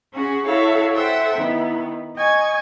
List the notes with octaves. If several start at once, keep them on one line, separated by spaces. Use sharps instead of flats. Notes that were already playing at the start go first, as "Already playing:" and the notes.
C#4 F#4 G#4
E4 F#4 A4 C#5 E5 F5
A4 C5 E5 F#5 G5
D#3 B3 E4
D#5 G#5 C#6 G#6